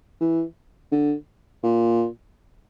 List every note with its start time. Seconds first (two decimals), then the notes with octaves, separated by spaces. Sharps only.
0.21 E3
0.92 D3
1.63 A#2